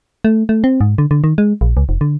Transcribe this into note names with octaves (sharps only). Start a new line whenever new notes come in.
A3
A3
C4
G#2
D3
D3
D#3
G#3
A#1
C#2
F1
D3